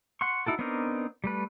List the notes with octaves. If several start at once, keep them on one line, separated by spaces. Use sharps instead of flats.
F#5 C6 C#6
D#4 E4 F#4 A4
B3 C4 D4 D#4 A#4
G3 A3 B4